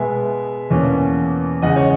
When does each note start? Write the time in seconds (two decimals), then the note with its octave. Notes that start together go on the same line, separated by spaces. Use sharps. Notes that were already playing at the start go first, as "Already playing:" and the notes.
Already playing: B2 G#3 B3 E5 G#5
0.70 E2 B2 A#3 C#4
1.62 E2 C#3 G#3 D#5 F#5
1.76 C#5